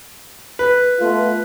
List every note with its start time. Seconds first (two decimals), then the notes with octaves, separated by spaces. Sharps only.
0.59 B4
1.00 A3 B3 F4